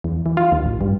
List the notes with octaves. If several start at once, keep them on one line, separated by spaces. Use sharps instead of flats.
E2
E3
F4
D#2
A1
G2